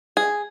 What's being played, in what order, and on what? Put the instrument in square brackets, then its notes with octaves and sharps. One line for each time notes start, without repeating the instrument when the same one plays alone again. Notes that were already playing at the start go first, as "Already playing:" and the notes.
[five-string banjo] G#4